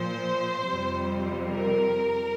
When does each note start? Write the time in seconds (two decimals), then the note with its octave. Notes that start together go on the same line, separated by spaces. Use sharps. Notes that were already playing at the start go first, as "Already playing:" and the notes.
Already playing: A#2 F3 C5
0.70 F2 C3 G3
1.49 A#4